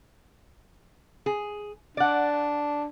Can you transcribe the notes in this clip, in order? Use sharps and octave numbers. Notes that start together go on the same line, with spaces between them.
G#4
D4 D5 F#5